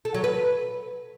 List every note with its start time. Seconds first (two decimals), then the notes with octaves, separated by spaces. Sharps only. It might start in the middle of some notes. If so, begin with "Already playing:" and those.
0.05 A4
0.14 F#3
0.24 B4